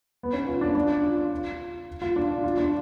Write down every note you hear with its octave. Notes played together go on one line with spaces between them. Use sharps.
B3
C#4
F4
D4
D4
F4
F4
D4
F4
D4